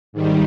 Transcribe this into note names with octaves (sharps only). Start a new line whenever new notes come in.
G#2 D#3 G3